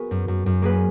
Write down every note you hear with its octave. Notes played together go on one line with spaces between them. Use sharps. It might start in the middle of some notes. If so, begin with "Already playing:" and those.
Already playing: B3 F#4 G#4 A#4
F#2
F#2
F#2
A#3 G#4 B4